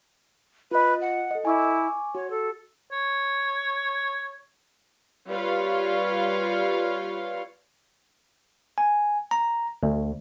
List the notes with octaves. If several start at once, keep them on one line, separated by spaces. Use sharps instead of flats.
F4 B4 D#5
F#5
A4 D#5
E4 G#5 C#6 D6
F#4 C#5
A4
C#5
G3 F4 B4 C#5 F5
G#5
A#5
D2